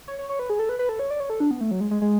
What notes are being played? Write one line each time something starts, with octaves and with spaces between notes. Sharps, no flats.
C#5
C#5
C#5
B4
G#4
A4
B4
B4
A4
C#5
D5
C#5
A4
D4
B3
A3
F#3
G#3
G#3
G#3